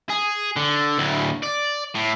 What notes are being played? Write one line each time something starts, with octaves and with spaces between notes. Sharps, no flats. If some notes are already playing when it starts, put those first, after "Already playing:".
G#4
D3
D2 A2
D5
A2